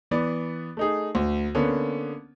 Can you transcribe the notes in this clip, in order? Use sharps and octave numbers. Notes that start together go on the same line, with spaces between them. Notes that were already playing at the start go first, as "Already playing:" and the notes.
E3 B3 D5
A3 D#4 G#4
D2
D3 A#3 B3 C#4